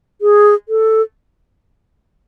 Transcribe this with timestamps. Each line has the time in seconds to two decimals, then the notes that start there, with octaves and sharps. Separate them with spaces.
0.21 G#4
0.69 A4